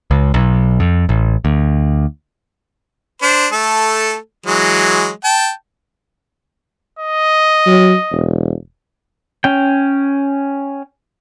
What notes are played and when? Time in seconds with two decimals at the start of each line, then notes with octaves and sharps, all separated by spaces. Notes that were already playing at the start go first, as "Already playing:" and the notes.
0.11 C#2
0.34 B1
0.80 F2
1.09 A1
1.45 D2
3.22 D4 C5
3.52 A3 A4
4.46 E3 F#3 G#3
5.24 G5 A5
6.99 D#5
7.67 F#3
8.11 E1
9.44 C#4 G5